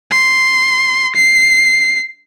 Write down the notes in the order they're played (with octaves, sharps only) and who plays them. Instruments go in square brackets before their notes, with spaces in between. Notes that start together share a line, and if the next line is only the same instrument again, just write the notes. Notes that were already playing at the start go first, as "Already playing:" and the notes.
[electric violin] C6
C7